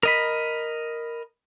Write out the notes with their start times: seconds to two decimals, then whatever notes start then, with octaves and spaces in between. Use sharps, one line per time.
0.03 A#4 D#5 B5